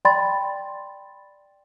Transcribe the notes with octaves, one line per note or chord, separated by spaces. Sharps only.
D5 G5 B5 C6 A6